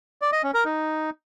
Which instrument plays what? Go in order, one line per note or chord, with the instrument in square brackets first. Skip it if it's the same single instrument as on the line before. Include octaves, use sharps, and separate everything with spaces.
[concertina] D5
D#5
C#4
A#4
D#4